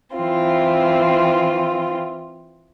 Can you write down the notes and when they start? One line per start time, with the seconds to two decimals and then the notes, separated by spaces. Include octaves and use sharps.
0.15 E3 C4 F4